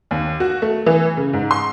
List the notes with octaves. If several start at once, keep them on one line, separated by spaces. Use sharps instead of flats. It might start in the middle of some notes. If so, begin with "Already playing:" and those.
D#2
F#4
A3
E3
C#3
G#2
C6